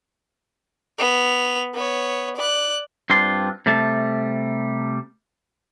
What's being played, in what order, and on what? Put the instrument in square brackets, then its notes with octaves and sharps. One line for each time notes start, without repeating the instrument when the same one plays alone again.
[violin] B3 F7
B3 C#5
D5 F#6
[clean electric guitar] G2 C4 D4 F4 C6
C3 G3 A3 A5